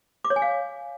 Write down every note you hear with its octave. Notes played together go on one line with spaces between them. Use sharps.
D6
C#5
G#5
F5